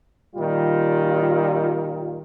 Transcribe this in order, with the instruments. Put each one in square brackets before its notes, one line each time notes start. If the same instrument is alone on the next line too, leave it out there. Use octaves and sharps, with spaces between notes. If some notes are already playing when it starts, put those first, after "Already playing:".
[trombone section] A#2 D#3 G3 F4